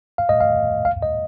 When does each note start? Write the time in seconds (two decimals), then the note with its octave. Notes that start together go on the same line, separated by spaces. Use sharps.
0.18 F5
0.29 D#5
0.41 F5
0.85 F5
1.02 D#5